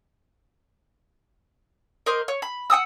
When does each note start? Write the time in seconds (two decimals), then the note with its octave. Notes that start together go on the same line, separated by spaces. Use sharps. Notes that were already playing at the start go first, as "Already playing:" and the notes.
2.06 A#4 C5 D#5 D6
2.28 C#5
2.42 B5
2.70 F#5 G5 D#6 E6